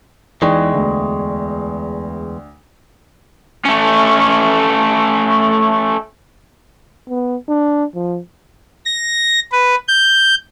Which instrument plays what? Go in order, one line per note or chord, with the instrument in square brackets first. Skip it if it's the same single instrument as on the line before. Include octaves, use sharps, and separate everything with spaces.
[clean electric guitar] E2 G#3 [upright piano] E3 D#4 [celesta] D5 G5 C#6
[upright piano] D2
[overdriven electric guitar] A3 C#4
[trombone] B3
D4
F3
[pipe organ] A#6
B4
G6